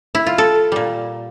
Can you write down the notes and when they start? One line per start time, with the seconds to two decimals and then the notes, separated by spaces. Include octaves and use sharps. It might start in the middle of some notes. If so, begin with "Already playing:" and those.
0.15 E4
0.27 F4
0.38 A4
0.72 A#2 G3